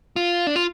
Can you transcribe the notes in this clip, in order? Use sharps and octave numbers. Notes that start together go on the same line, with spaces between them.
F4
D4
F4